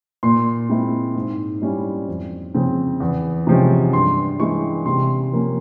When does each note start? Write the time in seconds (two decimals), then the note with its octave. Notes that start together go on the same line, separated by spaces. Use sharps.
0.23 A#2 C6
0.69 G#3 C4 E4
1.16 G#2
1.62 G3 C#4 E4
2.08 F2
2.54 C#3 F3 C4
3.00 E2
3.47 C3 F3 G#3 C#4
3.93 G2 C6
4.40 E3 G#3 C#4 E4 C#6
4.86 C3 C6
5.32 F3 A#3 C#4